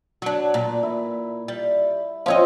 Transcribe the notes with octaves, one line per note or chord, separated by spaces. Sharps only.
F#3 D4
A#2
E4
G3
F3 C4 C#4 C#5 D#5